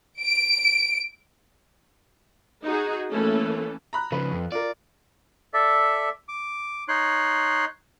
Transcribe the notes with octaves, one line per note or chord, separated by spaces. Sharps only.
D7
D#4 F#4 G#4
E3 A3 A#3 C#4 A4
A#5 B5 F#6
C#3 F3 B4
F2
F4 A#4 D5
A4 D5 E5
D6
D#4 C#5 C6 F#6